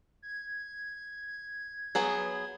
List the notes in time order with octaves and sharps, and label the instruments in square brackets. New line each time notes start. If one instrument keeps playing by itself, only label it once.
[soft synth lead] G#6
[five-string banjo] F#3 B3 G#4